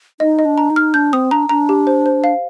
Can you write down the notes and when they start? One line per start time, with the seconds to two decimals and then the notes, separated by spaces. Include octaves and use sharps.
0.20 D#4 D#5
0.39 D#5
0.45 D4
0.58 A#5
0.70 D#4
0.76 F6
0.94 D4 G6
1.13 C4 D#6
1.31 D4 A#5
1.49 D4 A#5
1.69 G4
1.87 C5
2.06 C5
2.24 F5